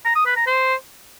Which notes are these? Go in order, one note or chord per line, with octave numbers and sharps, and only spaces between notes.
A#5
D#6
B4
A#5
C5